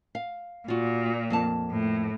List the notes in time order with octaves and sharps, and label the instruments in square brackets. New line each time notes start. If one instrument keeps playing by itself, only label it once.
[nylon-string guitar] F5
[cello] A#2 [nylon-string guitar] F4 F#4
[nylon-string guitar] F2 A#3 A5
[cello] A2